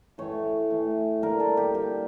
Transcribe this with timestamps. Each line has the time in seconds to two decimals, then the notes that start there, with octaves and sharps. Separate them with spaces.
0.18 A2 E3 A3 C#5
0.70 A2 E3 A3
1.22 D3 G3 A#3 A#4
1.40 A4
1.57 G4
1.74 D3 G3 A#3 G4